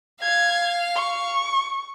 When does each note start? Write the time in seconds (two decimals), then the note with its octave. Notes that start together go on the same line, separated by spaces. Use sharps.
0.22 F5 G#6
0.95 C#6